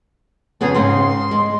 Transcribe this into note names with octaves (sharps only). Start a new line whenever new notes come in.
F2 C#3 B3 G#4
G#2 C#3 C4 C6
G#3